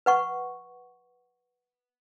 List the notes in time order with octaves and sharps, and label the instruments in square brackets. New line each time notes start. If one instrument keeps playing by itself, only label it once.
[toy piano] B4 F#5 C#6